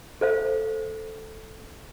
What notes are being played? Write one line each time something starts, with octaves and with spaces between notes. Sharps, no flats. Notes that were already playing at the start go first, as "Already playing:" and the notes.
A4 C5 F5